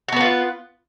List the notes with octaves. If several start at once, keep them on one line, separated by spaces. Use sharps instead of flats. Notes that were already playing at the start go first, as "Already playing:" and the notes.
B3 F4 F#4 B4